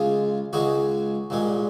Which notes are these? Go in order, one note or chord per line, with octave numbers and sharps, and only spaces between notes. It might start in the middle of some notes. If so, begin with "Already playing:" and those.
Already playing: C#2 C#3 G#3 F4
C#2 C#3 G#3 F#4
C2 A#2 G#3